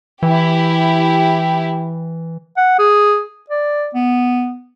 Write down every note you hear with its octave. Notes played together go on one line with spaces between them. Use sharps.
E3 E4 G4
F#5
G#4
D5
B3